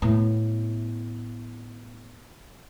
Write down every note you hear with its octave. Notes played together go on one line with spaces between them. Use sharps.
A2 B3